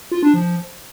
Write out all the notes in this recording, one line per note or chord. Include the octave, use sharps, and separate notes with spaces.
F4
D4
F3